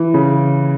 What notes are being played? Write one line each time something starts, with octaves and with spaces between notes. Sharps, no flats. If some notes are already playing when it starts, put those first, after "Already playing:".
Already playing: E3
C#3